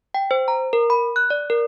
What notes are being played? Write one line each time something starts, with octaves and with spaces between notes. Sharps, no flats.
G5
C5
A#5
A#4
B5
F#6
D5
A#4